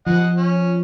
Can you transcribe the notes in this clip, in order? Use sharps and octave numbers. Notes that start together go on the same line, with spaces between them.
F3 D#5 F#5
C#4